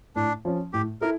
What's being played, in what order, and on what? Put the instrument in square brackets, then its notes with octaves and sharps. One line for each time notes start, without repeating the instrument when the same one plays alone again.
[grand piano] A2 [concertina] D4
[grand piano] F3 C#4
[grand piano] A2 [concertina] G4
[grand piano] E4 A4 [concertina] A#4